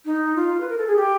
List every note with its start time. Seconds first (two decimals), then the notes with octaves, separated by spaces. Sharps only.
0.05 D#4
0.36 F4
0.60 B4
0.69 A#4
0.78 A4
0.87 G#4
0.96 G4